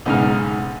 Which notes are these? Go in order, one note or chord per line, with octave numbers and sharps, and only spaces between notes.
B1 G#2 C#3 D#4 F6